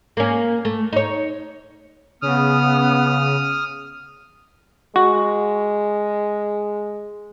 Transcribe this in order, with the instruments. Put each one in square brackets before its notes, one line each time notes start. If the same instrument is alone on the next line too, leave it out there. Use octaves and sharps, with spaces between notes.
[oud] A#3 C#4
A3
D#4 C#5
[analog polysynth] C#3 [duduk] B3 [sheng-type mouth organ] D#6 F6
[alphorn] G#3 [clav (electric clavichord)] F#4